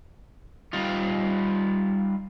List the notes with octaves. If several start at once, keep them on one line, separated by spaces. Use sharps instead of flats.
G3 D#4 F4